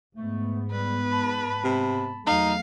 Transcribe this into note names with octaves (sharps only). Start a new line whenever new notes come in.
G#2 A3 B3
G3 B4
A5 B5
C3
E2 F#3 A3 D#4 F5